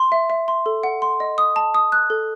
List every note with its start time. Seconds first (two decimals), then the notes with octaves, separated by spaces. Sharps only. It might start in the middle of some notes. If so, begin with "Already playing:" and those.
Already playing: C6
0.12 E5
0.30 E5
0.48 C6
0.66 A4
0.83 F#5
1.02 C6
1.20 D#5
1.38 D#6
1.56 A5
1.75 D#6
1.92 F#6
2.10 A4